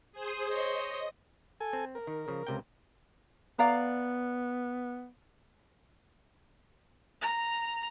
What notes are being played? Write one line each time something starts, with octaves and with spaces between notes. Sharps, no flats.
G#4 C5 D#6
C5 C#5 D#5
A4 G#5
C4
A#4
D#3
C#3 F3
C#2 C3 G5
B3 D5 F5 A#5
A#5